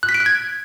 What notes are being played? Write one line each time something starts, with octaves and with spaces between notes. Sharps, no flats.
F#6
B6
D7
F#6
G#6